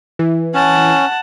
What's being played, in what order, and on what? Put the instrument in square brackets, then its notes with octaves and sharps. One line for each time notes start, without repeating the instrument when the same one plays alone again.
[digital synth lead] E3
[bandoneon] C#4 [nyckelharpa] F#5 A5